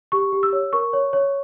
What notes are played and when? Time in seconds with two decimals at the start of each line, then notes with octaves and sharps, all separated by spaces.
0.12 G4 C#6
0.32 G4
0.43 E6
0.53 C#5
0.73 A#4 C#6
0.93 C#5
1.13 C#5